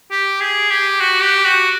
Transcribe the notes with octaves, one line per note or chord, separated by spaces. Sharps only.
G4
G#4
G4
F#4
G4
F#4